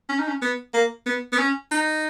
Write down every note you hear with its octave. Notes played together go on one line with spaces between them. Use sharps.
C#4
D#4
C#4
B3
A#3
B3
B3
C#4
D#4